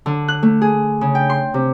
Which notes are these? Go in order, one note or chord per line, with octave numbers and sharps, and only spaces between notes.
D3
F#6
A3
G#4
C#3
G5
C6
C3